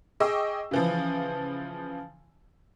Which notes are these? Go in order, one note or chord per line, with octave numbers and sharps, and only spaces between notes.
G#4 D#5 G5 C#6 D6 E6
C#3 E3 F3